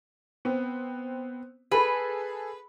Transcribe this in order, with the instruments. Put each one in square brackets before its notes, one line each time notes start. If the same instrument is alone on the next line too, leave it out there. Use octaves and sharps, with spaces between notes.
[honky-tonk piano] B3 C4
[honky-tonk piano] G#4 A4 [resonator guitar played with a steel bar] B4